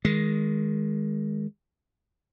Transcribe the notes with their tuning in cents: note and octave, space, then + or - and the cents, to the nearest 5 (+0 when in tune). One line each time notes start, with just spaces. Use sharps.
D#3 +15 G#3 +0